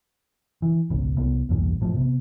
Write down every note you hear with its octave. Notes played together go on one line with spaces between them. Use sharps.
E3
G#1 C#2 B2
C2 B3
B1 E2 G2 A#2
A1 A2 F3
C3 B3